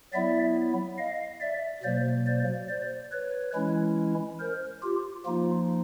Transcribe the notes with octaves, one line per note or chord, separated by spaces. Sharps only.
F#3 B3 E4 D5 E5
D#5 F5
D5 E5
B2 F#3 A#3 C5 D5
C5 D5
C5 D5
B4 C#5
E3 G#3 C#4 E4
A#4 C5
F4 G4
F3 A#3 D#4 F4